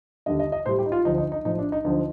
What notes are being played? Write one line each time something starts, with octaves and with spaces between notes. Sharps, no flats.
D#2 D3 G3 D#5
D#5
D#5
A2 G3 C5
G4
D#4
F4
D2 D3 F3 D#4
D#4
D#4
A2 F3 D#4
D4
D#4
D2 D3 F3 D#4